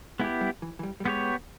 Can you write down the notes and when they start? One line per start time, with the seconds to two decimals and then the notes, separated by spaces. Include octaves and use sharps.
0.20 G#3 B3 E4 G4
0.41 G3
0.62 E3
0.79 E3
0.83 G3
1.00 G3
1.05 G#3 B3 G4 C#5